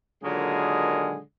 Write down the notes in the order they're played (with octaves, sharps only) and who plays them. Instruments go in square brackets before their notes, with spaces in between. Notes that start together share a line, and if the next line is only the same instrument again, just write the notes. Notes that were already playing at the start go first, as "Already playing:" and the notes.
[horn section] A#2 D3 D#3 F#3 G#3 G#4